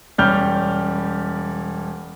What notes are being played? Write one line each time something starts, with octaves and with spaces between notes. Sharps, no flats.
E1 G3 C#4 F6 G6